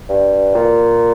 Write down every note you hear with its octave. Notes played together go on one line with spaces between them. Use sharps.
G2
A#2